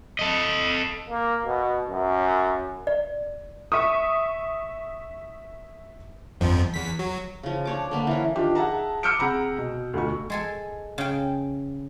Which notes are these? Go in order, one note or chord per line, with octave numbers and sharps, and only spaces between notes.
A4 D#5
A#3
B2
F#2
D5
E5 C#6 D#6
G1 F2 F3
E2 B6
F#3
C#3 F3
D4 C#5 D6
D3 A#3 B3
E3 C#4
D#3 F3 D4 F4 G4
G#4 E5 F#5 A5 A#5
D6 E6 F6 G6 C#7 D7
C3 G#4 F#5 A#5 B5
B2
D2 B2 F4 F#4 C#6
G#3 A4 G#5
C#3 G5